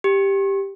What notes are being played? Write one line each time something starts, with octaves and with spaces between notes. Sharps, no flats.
G4